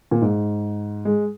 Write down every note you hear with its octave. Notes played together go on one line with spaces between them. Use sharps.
A#2
G#2
G#3